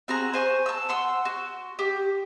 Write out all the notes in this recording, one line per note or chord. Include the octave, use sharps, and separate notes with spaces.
C4 F#4 G#4 A#5
C5 G#5 C#6
A5 E6
F#5 C6 E6
F#4
G4